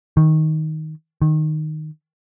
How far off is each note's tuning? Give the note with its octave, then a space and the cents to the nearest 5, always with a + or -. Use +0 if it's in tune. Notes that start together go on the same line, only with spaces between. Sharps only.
D#3 +10
D#3 -10